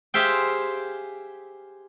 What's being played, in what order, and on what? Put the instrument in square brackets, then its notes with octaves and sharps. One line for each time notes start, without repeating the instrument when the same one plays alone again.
[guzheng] G4 G#4 C5 E5 F5 G5